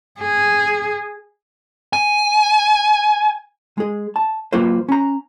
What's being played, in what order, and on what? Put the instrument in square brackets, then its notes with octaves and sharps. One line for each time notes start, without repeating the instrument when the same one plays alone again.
[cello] G#4
[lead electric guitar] G#5
[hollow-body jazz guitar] G#3 G#4
A5
F#3 A#3 F4 B4 C5
C#4 A#5